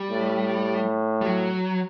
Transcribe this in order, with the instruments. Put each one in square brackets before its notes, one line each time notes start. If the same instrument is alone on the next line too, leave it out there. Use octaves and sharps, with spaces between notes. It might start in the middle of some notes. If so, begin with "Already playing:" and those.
Already playing: [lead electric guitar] G3
[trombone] A2
[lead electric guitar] G3
F#3